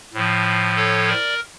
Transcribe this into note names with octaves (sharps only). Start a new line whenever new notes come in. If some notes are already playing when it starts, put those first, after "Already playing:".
A2 F3
A4 C#5
A#4 D5